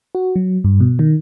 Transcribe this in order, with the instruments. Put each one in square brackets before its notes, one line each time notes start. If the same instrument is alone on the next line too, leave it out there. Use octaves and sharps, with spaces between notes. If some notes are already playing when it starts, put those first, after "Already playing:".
[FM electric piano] F#4
F#3
G2
B2
D#3